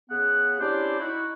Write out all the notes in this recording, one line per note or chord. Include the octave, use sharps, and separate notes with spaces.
C#3 B3 F#5
C#4 D4 E4 G4 C5 D5
D#4 E4 F#4